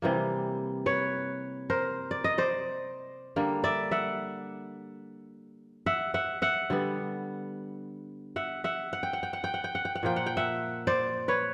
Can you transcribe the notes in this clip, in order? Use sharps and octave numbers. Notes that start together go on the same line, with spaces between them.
C3 E3 G3 A#3
B4 C#5
A#4 C5
D5
D#5
C5 D5
D3 G3 A#3
D5 E5
E5 F#5
E5 F#5
E5 F#5
E5 F#5
D3 G3 B3
E5 F#5
E5 F#5
F#5
G5
F#5
G5
F#5
G5
F#5
G5
F#5
G5
F#5
A#2 F3 A#3 G5
F#5
G5
E5 F#5
C5 D5
B4 C#5